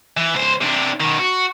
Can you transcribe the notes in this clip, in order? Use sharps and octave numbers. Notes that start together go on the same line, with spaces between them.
E3
C#2 C5
C3 D4
B2 D#3
F#4